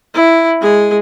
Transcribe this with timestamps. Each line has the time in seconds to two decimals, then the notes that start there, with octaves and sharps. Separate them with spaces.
0.14 E4
0.61 G#3 G#4